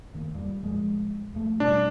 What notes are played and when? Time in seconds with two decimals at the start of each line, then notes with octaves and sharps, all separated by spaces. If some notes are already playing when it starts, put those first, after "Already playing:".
0.13 F#1 D#3 A#3
0.35 F2 G3
0.64 A#2 F3 G#3
1.33 F1 F2 A3
1.60 B2 G3 D4